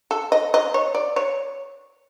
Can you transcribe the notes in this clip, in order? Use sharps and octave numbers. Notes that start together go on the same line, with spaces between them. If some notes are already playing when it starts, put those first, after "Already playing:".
A4
D#5
D#5
C#5
D5
C#5